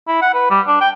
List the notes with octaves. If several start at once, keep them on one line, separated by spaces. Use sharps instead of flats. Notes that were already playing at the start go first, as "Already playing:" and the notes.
E4
F#5
B4
G3
D4
G5